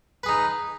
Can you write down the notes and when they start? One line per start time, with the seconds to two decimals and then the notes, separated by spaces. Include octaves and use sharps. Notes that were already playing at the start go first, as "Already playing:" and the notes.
0.23 B4
0.26 G#4
0.29 D#4